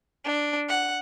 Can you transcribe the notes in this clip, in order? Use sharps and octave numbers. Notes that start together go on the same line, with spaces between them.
D4
F#5